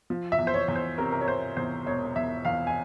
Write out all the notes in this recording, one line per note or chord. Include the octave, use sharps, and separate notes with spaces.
F3
E5
E2
C5
C#5
E2
C5
C3 A#4
A#4
C#5
C3 C5
E2 C5
E1 C#5
E2 E5
E2 F5
G#5